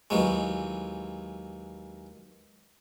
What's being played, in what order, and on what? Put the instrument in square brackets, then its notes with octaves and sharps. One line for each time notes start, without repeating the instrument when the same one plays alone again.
[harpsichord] D#2 E3 F#3 G#3